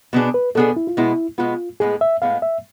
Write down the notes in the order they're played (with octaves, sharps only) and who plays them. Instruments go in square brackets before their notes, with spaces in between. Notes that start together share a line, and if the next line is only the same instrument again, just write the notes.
[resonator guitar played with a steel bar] B2 B3 D4 G#4
[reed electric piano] B4
[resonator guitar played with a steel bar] B2 B3 D4 G#4 [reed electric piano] A4
[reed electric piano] E4
F4
[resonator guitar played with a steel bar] B2 G#3 B3 [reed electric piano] E4
[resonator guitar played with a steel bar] B2 G#3 B3 [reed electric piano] F4
[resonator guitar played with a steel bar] A2 G#3 B3 [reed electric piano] G#4
[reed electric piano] E5
[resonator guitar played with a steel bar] A2 G#3 B3 [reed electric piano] F5
[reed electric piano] E5